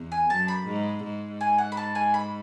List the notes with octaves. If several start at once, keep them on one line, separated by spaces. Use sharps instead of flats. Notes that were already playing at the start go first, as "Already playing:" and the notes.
Already playing: E2
G#5
F#2 A5
B5
G#2
G#2
G#5
F#5
B5
A5
G#5
B5